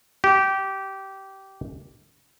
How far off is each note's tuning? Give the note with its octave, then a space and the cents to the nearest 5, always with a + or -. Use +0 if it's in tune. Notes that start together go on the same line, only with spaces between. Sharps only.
G4 -20